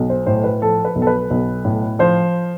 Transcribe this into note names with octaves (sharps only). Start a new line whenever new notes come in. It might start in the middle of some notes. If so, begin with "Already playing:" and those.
Already playing: B1
C5
A2 C5
B4
F3 A4
B4
B1
A4
B4
B1
A2
F3 C5